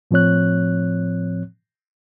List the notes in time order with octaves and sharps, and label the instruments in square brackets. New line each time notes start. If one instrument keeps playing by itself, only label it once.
[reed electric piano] A2 F3 C4 C#5 F#6